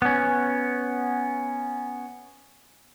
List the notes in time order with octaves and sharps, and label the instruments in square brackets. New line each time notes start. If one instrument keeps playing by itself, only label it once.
[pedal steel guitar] B3 C#4